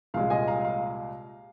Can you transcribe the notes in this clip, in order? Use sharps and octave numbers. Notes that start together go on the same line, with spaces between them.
C2 A#2 G#3 F5
D#5 G#5
F5 A#5
F5